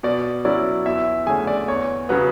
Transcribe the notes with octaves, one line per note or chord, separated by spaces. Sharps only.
B2 D5
F#3 C#4 E4 D5
E2 E4 E5
D3 A3 C#4 G#4 G#5
D5
E2 C#5
C#3 F#3 B3